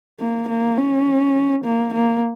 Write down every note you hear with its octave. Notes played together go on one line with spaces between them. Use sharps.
A#3
A#3
C#4
A#3
A#3